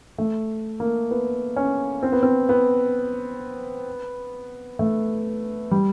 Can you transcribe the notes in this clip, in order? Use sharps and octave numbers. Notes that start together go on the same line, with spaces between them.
A3
A#3
B3
C#4
C4
B3
C4
B3
A3
G3